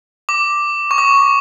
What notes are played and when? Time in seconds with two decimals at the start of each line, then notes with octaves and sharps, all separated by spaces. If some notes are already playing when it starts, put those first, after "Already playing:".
0.29 D6
0.91 C#6
0.98 D6